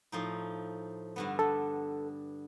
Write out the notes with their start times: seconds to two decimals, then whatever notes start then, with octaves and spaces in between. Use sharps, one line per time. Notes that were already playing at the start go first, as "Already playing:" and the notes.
0.12 A2 F3 D#4
1.16 G2 D3 B3
1.39 G2 A4